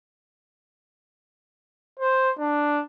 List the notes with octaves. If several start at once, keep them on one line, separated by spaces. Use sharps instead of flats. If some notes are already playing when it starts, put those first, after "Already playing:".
C5
D4